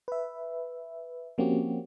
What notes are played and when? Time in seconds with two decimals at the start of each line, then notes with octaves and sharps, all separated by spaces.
0.08 B4 E5
1.38 F3 A#3 C4 C#4 F#4 G4